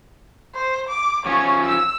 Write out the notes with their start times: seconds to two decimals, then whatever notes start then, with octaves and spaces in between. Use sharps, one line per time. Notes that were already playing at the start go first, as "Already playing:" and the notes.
0.55 C5
0.89 D6
1.26 F3 C#4 C#5
1.65 E6